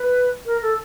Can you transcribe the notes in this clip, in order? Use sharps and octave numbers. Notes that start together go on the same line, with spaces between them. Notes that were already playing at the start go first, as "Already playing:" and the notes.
Already playing: B4
A#4
A4